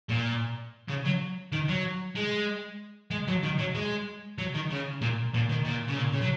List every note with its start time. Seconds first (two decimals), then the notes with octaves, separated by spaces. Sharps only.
0.09 A#2
0.88 C#3
1.05 F#3
1.52 D#3
1.68 F#3
2.15 G#3
3.11 G#3
3.28 F#3
3.43 D#3
3.59 F#3
3.75 G#3
4.38 F#3
4.54 D#3
4.71 C#3
5.01 A#2
5.34 A#2
5.50 D#3
5.65 A#2
5.88 C#3
5.97 A#2
6.13 C#3
6.22 F#3